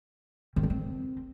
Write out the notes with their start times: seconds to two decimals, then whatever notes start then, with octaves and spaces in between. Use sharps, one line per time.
0.56 D#3
0.63 G3
0.70 C4